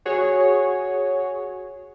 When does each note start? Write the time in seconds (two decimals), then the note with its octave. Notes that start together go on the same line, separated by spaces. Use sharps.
0.06 F#4 G#4 C#5